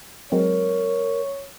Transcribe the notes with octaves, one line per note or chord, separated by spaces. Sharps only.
F#3 G#3 C4 A#4 C#5